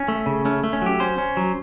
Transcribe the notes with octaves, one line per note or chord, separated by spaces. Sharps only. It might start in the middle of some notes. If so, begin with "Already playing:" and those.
Already playing: C#4
A3
C#3
A3 C#4
A3
C#4
F#3 G4
C#4 C5
C#4
F#3